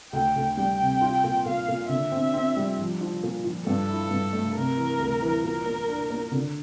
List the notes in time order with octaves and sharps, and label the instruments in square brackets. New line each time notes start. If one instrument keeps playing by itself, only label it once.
[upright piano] D2 [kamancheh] G5
[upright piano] D2
[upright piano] G3 [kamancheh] G5
[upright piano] C3
F4
A#2
[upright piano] A#2 [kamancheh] F5
[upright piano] A#2
[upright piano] D3 [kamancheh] E5
[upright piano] C4
C4
G3
F3
F3
A#2
F3
[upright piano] G2 [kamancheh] A4
[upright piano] E4
G2
A3
[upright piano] C3 [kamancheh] A#4
[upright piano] E3
D2
E3
[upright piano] A#2 [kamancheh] A#4
[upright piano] A#3
D4
A#3
D3